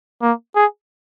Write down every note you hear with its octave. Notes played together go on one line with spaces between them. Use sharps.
A#3
G#4